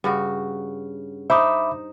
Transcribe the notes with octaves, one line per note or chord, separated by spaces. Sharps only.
G2 C#3 F#4
D#4 C5 E5 B5 D6